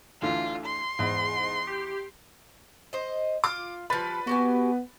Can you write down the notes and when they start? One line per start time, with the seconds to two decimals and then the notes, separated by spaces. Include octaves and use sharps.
0.22 D2 D3 E3 F4
0.66 C6
0.99 E2 G#2
1.67 G4
2.93 C5 D#5
3.44 F4 D6
3.90 F3 G3 B4 B5 A6
4.27 B3 F#4 G4 G#5